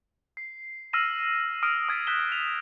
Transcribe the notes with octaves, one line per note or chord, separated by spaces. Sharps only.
C7
E6 F6 A#6 C7 D#7 E7
D#6 F6 D7 D#7
D#6 F6 G#6 A6 B6
F#6 G6 B6 E7 G7
F7